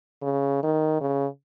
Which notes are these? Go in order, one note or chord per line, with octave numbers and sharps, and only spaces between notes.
C#3
D#3
C#3